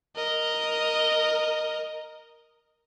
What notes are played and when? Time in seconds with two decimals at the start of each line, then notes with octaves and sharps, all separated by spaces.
0.16 A#4 D#5